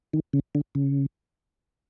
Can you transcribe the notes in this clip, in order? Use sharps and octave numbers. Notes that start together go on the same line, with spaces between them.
D#3
C#3
D3
C#3